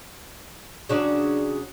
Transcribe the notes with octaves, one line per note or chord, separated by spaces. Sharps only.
C#3 F#3 D4